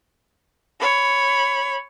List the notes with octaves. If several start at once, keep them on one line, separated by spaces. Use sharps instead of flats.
C#5 B5